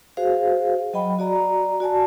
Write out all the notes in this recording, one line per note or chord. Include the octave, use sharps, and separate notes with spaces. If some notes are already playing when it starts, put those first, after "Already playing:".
F#4 G#4 C5 F5
F#3 D#5 G5 B5
F#4 D5 A#5
F#4 D5 G#5 A5